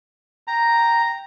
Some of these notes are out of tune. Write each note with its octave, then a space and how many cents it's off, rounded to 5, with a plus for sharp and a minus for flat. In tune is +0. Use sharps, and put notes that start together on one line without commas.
G5 +0 A#5 +0